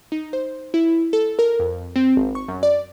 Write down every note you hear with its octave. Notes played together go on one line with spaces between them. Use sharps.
D#4
C5
E4
A4
A#4
F2
C4
G#1
C#6
F#2
D5